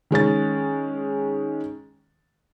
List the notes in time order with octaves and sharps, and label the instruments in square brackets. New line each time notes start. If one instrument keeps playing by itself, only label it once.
[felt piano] D#3 G#3 C#4 A6